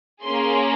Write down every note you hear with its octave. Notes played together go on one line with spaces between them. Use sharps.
A#3 C#4 G#4 C6